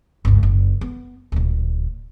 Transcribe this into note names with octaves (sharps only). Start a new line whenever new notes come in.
G1 C#2
F#1
B3
D1 A#2